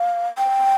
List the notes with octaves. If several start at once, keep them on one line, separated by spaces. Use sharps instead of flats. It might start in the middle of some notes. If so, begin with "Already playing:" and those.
Already playing: F5
G5